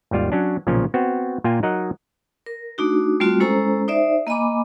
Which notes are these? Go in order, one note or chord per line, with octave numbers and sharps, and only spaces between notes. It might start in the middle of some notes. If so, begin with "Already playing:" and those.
G#1 D#2 G3 F4 F5
F#3 C#4 D4
B1 A#2 C#3 F3 C#4
B3 C4 F#4
A#2 A#3 F4 G5 G#5
F#3 D#4 A#4 D#5 F#5
A#4
A3 D4 D#4 F#4
G3 A3 C4 F4 F#4
G#3 C#4 E4 A4 C5 A#5
D#4 C5 D5 E5
A#3 D#5 G#5 B5 D6